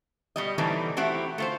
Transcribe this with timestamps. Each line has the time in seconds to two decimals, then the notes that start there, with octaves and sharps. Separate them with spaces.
0.36 B2 G3 D#5
0.58 B2 E3 G3 A3 C4 D#4
0.97 A3 C4 E4 F#4 G4
1.38 A3 F4 C5